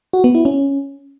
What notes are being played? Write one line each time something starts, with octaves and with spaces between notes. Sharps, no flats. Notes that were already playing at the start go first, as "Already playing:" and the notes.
F#4
B3
E4
C#4